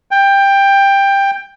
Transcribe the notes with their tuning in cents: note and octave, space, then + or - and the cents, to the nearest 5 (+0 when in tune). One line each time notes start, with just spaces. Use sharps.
G5 +15